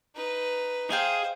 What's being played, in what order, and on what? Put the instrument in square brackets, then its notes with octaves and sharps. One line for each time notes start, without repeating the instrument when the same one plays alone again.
[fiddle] D#4 B4
[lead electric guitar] G#4 [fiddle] C5 [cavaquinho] D#5 F5 G5